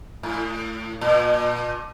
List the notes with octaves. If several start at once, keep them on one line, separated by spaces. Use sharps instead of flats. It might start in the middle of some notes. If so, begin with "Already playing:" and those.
A2
A#2